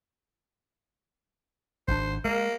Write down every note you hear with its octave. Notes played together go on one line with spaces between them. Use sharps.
G#1 C3 D4 C5
G#3 A#3